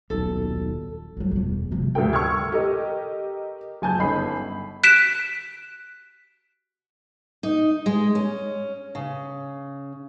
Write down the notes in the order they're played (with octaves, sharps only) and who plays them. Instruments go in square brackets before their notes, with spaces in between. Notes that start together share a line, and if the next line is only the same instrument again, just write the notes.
[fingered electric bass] D#1 B1 [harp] A4
[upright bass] F#3 G3
E1 G3
C3 F3
[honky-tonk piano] D2 G2 A#4 G5
C#6 E6 F6 G#6
G4 A4 A#4 D#5
F#1 G#5 A5 G6
G1 C#3 D#4 B5 C7
[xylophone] F#6 B6 D7 E7
[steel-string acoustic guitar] D#4
G#3
C#4
C#3